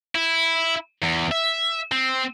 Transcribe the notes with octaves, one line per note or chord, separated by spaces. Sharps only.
E4
E2
E5
C4